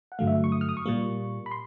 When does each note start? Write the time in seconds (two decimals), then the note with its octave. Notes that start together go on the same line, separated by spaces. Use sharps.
0.12 F#5
0.19 G2 D3 F#3 A3 F5
0.27 E5
0.44 C#6
0.52 D#6
0.61 F6
0.69 D#6
0.77 C#6
0.86 A#2 G3 A#3
1.46 B5
1.51 C6